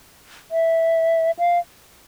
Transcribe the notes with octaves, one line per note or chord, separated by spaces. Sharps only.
E5
F5